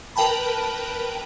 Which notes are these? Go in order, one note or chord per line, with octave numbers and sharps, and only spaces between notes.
A#4 B4 G5 A5 B5